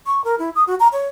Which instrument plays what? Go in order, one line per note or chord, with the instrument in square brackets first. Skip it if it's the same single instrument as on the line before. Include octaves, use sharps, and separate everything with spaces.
[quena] C#6
A#4
E4
D#6
F#4
A#5
C#5